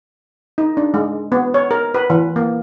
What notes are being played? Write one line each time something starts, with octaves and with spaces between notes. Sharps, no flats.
D#4
D4
G#3
B3
C#5
A#4
B4
E3
A#3